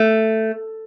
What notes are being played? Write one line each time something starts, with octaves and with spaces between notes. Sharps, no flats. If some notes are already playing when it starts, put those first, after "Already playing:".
Already playing: A3